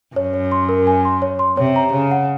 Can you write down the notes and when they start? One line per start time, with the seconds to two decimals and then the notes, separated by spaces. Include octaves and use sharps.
0.16 F#2 C#5
0.34 C#5
0.52 C6
0.69 A#4
0.87 G#5
1.05 C6
1.22 C#5
1.39 C6
1.57 C3 C#5
1.76 A#5
1.93 C#3 C#5
2.11 F#5